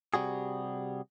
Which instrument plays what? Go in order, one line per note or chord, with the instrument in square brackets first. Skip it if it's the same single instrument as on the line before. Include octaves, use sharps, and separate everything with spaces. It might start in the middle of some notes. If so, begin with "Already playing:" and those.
[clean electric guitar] C3 G3 F#4 G#4